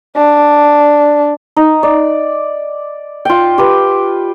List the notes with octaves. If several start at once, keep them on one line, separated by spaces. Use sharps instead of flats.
D4
D#4
D5
F4 G5
G4 B4